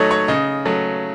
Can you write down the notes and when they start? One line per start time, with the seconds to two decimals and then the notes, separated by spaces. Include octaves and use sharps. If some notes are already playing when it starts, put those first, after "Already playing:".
Already playing: D#3 F#3 A3 C#5 D#5
0.11 C#5
0.28 C#3 D#5
0.65 F#3 A3